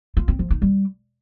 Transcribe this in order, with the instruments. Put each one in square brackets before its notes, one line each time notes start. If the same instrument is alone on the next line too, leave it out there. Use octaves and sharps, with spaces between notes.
[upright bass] F4
C4
F3
D#4
G3